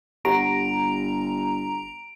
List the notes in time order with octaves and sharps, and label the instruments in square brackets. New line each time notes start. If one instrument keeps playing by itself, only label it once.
[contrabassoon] G1 [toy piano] G4 F#5 [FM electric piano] A#5 [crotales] D7